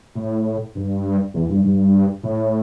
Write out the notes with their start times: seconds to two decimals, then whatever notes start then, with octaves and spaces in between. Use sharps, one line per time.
0.15 A2
0.75 G2
1.34 E2
1.49 G2
1.64 G2
2.23 A2